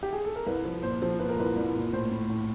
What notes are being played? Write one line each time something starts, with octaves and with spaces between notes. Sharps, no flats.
G4
G#4
A4
A#4
C2 B4
F3
A#2 C5
F3
A#2 B4
A#4
C2 B4
C2
A#2
A2 C5
A2
A2